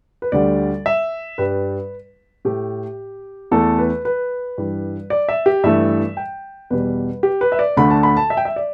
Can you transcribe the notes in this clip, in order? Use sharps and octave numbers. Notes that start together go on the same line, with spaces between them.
B4
D2 D3 G3 D5
E5
G2 G3 B4
A2 A3 G4
E2 E3 A3 A4
B4
B4
G2 E3 G3
D5
E5
G4
G2 E3 A3 E5
G5
E2 B2 G3 B4
G4
B4
E5
D5
D2 D3 A3 B5
A5
B5
A5
E5
G5
E5
D5